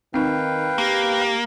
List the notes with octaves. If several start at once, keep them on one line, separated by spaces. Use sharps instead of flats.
D#3 C4 D#4 B4 F5 G5
A#3 G4